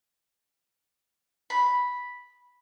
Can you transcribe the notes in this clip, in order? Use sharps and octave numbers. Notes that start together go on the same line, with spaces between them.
B5